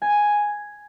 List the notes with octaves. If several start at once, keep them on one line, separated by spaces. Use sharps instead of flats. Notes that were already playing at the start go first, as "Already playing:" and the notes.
G#5